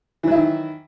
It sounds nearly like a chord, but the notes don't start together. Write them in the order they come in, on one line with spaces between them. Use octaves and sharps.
E3 F#3 E4 D#3